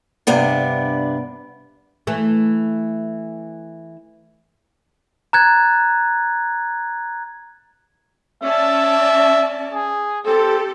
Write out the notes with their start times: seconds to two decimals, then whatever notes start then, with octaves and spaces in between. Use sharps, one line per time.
0.27 G2 C3 B3 D4
2.07 E3 A3
5.33 A#5 F#6 G#6 A6
8.43 C#4 D5 E5 A5
9.73 G#4
10.26 C4 G4 A4